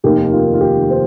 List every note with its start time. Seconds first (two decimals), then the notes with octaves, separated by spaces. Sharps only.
0.04 F1 D#2 D#3 A#3 G4
0.32 F4
0.54 F4
0.61 G4
0.90 C5